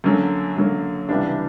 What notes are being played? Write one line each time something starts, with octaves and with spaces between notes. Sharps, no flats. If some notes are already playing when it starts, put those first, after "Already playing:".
F#2 D3 F#3 A#3
F#2 D3 F#3 A#3
C#2 C3 E3 G3 D4